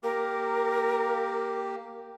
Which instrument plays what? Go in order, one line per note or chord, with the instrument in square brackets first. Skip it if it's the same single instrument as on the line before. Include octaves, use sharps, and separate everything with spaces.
[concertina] A#3 G4 [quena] A#4